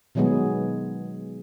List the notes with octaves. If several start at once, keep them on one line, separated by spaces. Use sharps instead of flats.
B2 D#3 F#3 G#3 B3 G#4